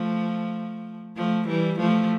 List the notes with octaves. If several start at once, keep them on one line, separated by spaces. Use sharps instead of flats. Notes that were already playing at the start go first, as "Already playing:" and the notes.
Already playing: F3 A3
F3 A3
E3 G3
F3 A3